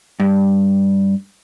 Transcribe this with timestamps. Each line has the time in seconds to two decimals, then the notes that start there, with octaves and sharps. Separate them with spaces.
0.20 G2